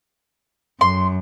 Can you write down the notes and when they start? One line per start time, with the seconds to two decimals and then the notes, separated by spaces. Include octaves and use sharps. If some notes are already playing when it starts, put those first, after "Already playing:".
0.81 F#2 C6